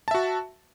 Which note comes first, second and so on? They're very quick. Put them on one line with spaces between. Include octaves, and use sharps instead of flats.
A5 E5 F#4